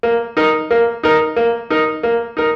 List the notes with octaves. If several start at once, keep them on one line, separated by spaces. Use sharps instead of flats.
A#3
D#4 A#4
A#3
D#4 A#4
A#3
D#4 A#4
A#3
D#4 A#4